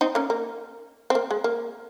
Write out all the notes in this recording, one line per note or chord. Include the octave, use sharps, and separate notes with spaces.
C4 D#4
A#3 C#4
A#3
C4
A#3
G#3
A#3